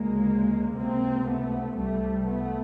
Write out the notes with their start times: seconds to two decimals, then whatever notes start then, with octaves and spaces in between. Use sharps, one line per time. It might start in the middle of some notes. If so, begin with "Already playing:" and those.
Already playing: D2 C#3 G#3 A#3
0.75 C#2 C3 A#3 C4
1.26 A3 B3
1.77 C2 C3 G3 A3
2.27 A3 B3